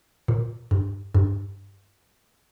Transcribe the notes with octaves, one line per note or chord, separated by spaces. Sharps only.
A#2
G2
G2